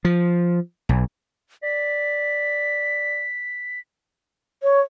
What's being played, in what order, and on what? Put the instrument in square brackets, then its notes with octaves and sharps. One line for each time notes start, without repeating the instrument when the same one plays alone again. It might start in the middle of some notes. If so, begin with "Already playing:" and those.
[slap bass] F3
B1
[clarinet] D5 [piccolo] B6
[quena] C#5